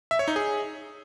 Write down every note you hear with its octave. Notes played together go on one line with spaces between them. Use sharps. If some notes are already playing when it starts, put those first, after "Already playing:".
E5
C#5
D#4
G#4